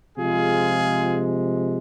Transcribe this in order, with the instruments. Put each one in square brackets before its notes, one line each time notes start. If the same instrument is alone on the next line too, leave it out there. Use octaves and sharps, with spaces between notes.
[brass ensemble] C3 F3 G#3 F4 G#4